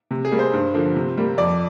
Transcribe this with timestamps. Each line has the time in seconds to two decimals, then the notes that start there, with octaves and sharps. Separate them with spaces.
0.11 C3
0.25 G#4
0.32 G3 A#3
0.39 C5
0.53 G2
0.74 D3 F3 A#3
0.96 C3
1.17 G3 A#3
1.38 F2 D5